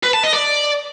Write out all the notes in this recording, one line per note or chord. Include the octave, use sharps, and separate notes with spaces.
B4
A5
D#5
D5